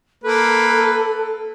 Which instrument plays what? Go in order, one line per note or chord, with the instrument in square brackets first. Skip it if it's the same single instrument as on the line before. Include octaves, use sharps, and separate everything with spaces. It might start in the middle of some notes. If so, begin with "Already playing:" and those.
[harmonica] A#3 B4 [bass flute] A4